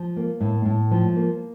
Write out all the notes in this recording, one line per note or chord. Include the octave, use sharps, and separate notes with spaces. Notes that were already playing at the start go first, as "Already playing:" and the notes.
Already playing: F3
A#3
A2
A2
F3
A#3